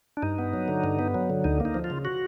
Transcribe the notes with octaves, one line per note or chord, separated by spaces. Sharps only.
D4
G2 D#4
B3
F#3
D3
G2
B3
F#3
D3
D2 D#4
A#3
D#4
F3
F4
C#3
F#4